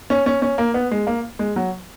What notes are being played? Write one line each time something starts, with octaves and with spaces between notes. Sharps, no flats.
C#4
C#4
C#4
A#3
B3
G#3
A#3
G#3
F#3